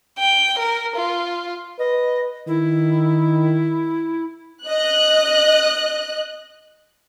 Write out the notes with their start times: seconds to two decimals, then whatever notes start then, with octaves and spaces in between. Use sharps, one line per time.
0.19 G5
0.59 A#4
0.96 F4
1.79 B4 D#5
2.47 D#3 E4
4.66 D#5 F#6